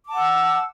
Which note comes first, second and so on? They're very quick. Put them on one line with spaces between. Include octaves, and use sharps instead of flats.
D6 A5 F#5 E6